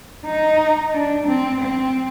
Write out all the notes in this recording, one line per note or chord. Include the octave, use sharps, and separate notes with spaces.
D#4
D4
C4
C4